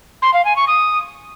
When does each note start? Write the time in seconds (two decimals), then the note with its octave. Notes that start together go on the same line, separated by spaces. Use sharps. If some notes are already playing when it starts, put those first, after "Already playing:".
0.22 C6
0.34 F5
0.45 G#5
0.56 C#6
0.68 D#6